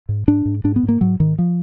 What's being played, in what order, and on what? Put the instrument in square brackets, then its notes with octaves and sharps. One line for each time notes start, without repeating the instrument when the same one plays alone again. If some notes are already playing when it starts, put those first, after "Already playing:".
[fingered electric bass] G#2
G#2 D4
G#2
G#2 D4
B3
G#2
A#3
G#2 F#3
G#2 D#3
F3